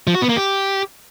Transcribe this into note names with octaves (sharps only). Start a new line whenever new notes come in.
F3
F#4
B3
A#3
G4